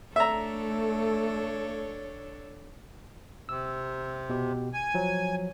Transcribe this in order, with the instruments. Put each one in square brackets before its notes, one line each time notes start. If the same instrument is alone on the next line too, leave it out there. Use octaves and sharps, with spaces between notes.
[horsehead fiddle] A3 [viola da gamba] D4 A4 C#5 [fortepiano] E5 A#5
[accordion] C3 [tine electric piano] E6
[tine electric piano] B2 G4
[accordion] G#5
[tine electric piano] F3 F#3